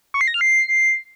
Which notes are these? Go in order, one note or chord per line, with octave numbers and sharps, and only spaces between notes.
C#6
C7
A#6
F6
C7